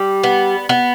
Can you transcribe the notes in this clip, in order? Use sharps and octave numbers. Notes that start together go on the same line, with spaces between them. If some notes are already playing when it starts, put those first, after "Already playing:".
Already playing: G3
B3
B3